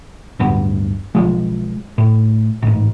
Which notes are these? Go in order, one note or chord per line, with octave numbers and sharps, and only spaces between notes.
D1 G2 B3
B1 F3 G#3
A2
A1 G#2